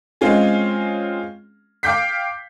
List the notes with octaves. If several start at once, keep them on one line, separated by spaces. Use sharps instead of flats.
G#3 C4 C#4 F4 G#4
F5 G5 D6 G6 B6 C7